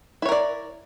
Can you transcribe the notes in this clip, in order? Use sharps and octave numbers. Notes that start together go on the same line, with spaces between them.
E4 A#4 C#5 D5